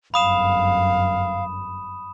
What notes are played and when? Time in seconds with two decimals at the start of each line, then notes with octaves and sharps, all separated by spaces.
0.14 G1 F#2 F5 B5 D#6 E7